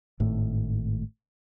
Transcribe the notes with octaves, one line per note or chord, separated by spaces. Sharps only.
G#1 A2 A3